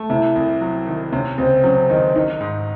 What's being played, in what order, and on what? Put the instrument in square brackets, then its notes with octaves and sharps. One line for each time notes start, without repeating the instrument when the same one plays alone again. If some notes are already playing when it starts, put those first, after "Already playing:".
Already playing: [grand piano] A3
[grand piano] C3 [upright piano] E4
[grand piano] C2
F#3
D#3
[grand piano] C3 [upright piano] C#4
[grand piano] C#2 [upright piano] C4
[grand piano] F#3 [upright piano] C#4
[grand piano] D#3 [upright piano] D#4
[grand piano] D#3 [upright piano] D#4
[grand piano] G#2